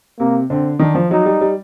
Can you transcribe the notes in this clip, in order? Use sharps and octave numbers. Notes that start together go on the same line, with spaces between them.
C3 A#3
D3 C4
D#3 D4
F3
F#3 D#4
G3
G3